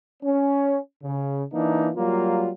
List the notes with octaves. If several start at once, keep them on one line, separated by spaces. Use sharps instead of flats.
C#4
C#3
E3 A#3 D4 D#4
F#3 G3 A#3 F4